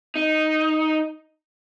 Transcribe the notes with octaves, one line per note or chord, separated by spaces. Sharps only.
D#4